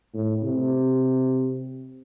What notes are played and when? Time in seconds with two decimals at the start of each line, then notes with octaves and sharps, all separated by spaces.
0.14 A2
0.44 C3